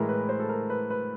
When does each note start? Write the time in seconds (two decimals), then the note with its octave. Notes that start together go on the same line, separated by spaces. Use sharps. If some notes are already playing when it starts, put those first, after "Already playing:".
Already playing: A2 E3 G#3 A#4
0.09 B4
0.29 C5
0.40 A4
0.49 A#4
0.70 B4
0.90 B4